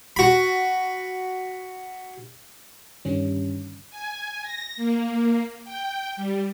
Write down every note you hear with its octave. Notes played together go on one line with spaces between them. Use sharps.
F#4 B5
G2 D3 D#3 G3 C#4
G#5
A#6
A#3
G5
G3